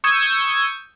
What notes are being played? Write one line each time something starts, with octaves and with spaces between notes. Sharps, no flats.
C#6 D#6 E6 G6 G#6